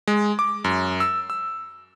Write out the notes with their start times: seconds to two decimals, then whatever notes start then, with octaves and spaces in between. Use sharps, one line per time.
0.07 G#3
0.39 D6
0.64 F#2
1.00 E6
1.30 E6